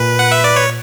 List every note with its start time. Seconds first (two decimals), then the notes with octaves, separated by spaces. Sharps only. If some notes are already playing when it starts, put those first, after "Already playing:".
Already playing: A#2 B4
0.19 F#5
0.32 E5
0.44 D5
0.56 C#5